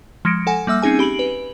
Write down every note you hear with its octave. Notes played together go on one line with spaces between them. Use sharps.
F3 G#3 A#6 C#7 D7
A4 F#5 G#5
G3 A#3 E5 E6
C4 C#4 D#4 G#4 G#5
G4 B5 D7 F#7
B4